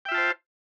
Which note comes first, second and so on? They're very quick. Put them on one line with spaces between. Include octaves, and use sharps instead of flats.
G5 E5 F4 A5 C5